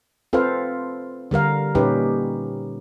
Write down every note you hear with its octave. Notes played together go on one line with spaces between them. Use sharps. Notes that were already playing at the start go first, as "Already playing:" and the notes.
C4 F4 A4 B4 C5 F5
D3 G3 A#4 F5
A#2 G3 C#4 D#4 G4 B4